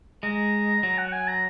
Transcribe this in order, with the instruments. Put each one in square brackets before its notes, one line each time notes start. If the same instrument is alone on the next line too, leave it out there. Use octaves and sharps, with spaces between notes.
[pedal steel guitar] G#3 [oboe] A#5
[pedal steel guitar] F#3 [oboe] A#5
[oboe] F#5
F#5
G#5
A#5